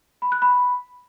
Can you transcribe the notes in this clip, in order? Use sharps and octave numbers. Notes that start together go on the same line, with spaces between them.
B5
F#6
B5